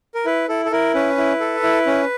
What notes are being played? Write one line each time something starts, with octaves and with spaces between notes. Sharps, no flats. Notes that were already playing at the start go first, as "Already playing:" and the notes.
A#4
E4 B4
E4 A4
A4
E4 A#4
C#4 B4
E4
A4
E4
C#4